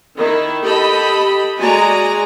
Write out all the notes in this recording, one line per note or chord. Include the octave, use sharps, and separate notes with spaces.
D#3 E4
G4 A4 D#5 B5
G#3 F#4 D5 G#5 A#5